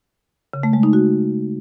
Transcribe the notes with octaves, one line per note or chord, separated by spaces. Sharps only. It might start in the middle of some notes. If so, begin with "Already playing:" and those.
C#3
A3
G#3
D#4
F#4